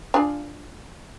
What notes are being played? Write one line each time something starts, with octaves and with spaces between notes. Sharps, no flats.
D4 F4 G#4